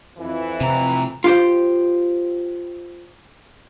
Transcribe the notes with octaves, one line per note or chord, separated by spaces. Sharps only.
F2 E3
A2 C3 C4 A#5
F4 G4 C5